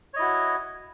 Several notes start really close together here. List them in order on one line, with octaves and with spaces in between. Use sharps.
C#5 D#5 E4 F#4